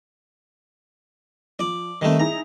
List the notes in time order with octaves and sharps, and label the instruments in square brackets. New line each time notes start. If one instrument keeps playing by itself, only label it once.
[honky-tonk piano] F3 [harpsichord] D5
[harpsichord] D#3 A3 [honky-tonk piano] G3 C4
[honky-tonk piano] D#4 E4 G#4 [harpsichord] A#5